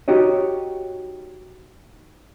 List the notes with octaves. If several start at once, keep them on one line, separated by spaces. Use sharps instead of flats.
D#4 F#4 G4 C#5 D#5